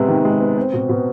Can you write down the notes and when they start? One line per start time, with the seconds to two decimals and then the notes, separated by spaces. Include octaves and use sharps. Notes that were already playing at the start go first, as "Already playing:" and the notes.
Already playing: C3 G#3 B3
0.08 D#3
0.25 G#3
0.41 B3
0.57 C4
0.73 B2
0.89 B2